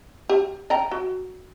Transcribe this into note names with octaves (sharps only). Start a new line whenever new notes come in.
G4
D#5 G5 A#5
F#4